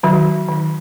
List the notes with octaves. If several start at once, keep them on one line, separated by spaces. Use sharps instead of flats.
D#3 F#3 F#4
D#3